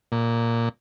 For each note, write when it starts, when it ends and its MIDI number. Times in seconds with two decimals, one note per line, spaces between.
0.12 0.69 46